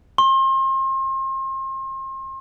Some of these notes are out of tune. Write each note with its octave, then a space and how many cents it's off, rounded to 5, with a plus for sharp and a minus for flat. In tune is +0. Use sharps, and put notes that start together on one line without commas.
C6 +35